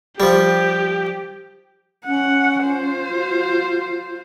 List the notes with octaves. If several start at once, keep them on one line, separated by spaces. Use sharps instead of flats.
F3 G3 G4
C#4 F#5
F4 C5
F#4